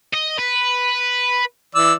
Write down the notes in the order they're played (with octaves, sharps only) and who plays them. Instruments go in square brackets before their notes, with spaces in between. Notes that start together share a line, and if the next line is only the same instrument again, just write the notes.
[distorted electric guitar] D#5
B4
[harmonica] E3 D5 E6